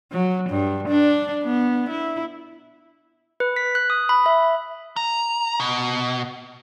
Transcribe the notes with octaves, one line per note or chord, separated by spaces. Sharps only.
F#3
G2
D4
B3
E4
B4
B6
F#6
D#6
B5
E5
A#5
B2